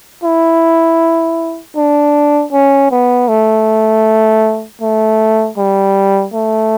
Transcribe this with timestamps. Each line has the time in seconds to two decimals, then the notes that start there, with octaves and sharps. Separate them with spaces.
0.24 E4
1.76 D4
2.53 C#4
2.91 B3
3.28 A3
4.81 A3
5.58 G3
6.34 A3